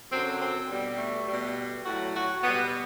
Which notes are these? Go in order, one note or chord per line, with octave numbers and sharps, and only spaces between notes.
F#2 D3 F#3 C4
C4
B2 G3
A3
B2 G3
A2 F#3 F#4
F#4
B2 G3 B3